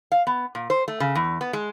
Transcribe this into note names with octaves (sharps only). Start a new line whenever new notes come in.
F5
B3
A#2
C5
A3
C#3
E2
B3
G#3